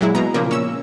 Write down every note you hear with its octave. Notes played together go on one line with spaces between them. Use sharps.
A#2 F#3 G#3 E4
B2 A#5
A#2 C#3 F3 A#3
C#4 E6